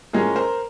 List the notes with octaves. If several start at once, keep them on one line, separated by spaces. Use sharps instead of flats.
A2 F3 G#3 C#4 G#4 A#4
A#4 C5